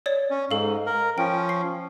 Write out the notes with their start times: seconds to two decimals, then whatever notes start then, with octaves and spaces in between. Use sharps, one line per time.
0.06 C#5 D5
0.31 C#4
0.51 G#2 A4 F5
0.86 A#4
1.18 F3 C#4 G5
1.49 C7